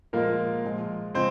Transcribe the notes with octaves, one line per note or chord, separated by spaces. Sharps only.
A#2 F3 G#3 A#3 A#4
A#2 F3 G#3
C#3 F3 G#3 C4 C5